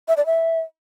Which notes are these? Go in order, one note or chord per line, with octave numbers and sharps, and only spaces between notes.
E5
D5
E5